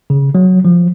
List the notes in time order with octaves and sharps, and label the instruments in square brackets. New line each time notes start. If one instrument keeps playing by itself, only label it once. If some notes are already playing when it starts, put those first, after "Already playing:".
[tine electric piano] C#3
F#3
F3